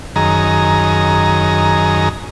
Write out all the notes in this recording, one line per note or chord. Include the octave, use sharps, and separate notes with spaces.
F#2 D#3 G#4 A#5